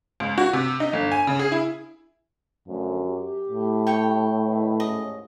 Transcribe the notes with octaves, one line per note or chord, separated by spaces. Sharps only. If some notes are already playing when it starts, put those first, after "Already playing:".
C#2
F#4
C3
D#4
G1
G#5
C#3
G#4
E4
F#2 D3 F3 A3
G4
A2
C#5 G5
D#3 E4 B4
D#2 G#2 C#4 D#5